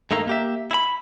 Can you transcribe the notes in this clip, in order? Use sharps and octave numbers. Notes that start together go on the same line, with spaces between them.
G2 D#3 A3 A#3 A#5
A#3 G4 E5
E4 B5